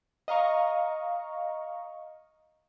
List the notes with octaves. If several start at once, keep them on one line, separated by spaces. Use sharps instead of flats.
D#5 F5 A#5 C#6